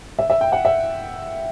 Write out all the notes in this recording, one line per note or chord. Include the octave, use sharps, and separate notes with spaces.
E5
E5
G5
F#5
E5